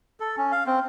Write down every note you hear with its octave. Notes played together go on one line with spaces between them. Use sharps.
A4
C#4
F5
C4